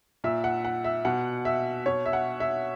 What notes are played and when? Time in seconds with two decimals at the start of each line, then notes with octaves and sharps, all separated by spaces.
0.24 A#2 E5
0.44 F#5
0.65 F#5
0.84 E5
1.05 B2 F#5
1.45 E5
1.86 B2 C#5
2.06 E5
2.13 F#5
2.40 E5